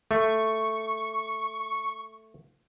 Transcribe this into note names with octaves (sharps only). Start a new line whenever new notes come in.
A3 C#6